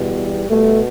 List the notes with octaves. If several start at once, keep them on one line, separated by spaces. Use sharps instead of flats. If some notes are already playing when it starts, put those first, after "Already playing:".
Already playing: E2 B2 G3
B2 G3 A3